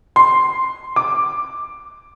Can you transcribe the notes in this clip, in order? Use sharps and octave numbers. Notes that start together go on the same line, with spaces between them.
C6
D6